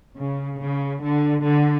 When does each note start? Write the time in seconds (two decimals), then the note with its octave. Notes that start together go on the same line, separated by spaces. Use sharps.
0.18 C#3
0.60 C#3
1.03 D3
1.45 D3